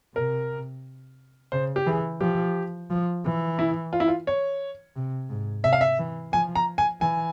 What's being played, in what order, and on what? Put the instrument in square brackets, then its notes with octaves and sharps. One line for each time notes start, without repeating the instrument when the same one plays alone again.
[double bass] C3 [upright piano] A#4
[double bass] C#3 [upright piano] C5
[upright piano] G4
[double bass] E3 [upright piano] G#4
[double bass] F3 [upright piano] G4
[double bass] F3
E3
[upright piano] E4
F4
E4
F4
C#5
[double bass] C3
G#2
[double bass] C3 [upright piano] E5
[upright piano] F5
E5
[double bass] E3
[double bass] F3 [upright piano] G#5
[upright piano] A#5
G#5
[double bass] E3 [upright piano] G#5